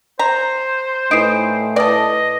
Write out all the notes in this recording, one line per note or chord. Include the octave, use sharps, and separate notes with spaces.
C5 A#5
A2 E3 D#4 C7 D7
A4 B4 D5 D#5